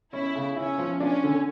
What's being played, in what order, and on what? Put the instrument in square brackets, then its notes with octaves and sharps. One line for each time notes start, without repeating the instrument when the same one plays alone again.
[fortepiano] C#4 [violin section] E4
[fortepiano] C#3
[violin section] C#4 [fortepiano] E4
[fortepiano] F3
[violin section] C#4 [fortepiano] D4
[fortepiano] D3